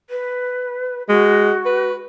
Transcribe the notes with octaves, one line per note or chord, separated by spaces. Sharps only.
B4
G#3 F#4
B4